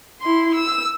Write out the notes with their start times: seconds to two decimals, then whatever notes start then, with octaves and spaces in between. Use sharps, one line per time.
0.21 E4 C6
0.55 E6